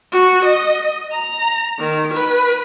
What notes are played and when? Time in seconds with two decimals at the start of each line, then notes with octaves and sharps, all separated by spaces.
0.12 F#4
0.45 D#5
1.12 A#5
1.79 D#3
2.14 B4